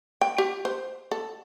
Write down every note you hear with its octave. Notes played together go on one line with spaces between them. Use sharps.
G5
G4
C5
A4